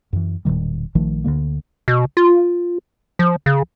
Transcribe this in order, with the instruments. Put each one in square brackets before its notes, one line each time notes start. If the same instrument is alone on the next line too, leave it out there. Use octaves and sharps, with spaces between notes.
[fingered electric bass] F#2 E3
E1 A#2 D#3 G3
A#1 D#3 F3 A3
D2 D3 G3 A#3
[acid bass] B2
F4
F3
C#3